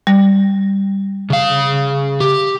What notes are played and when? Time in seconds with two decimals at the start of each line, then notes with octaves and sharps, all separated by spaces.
0.07 G3
1.30 C#3 F5
2.20 G4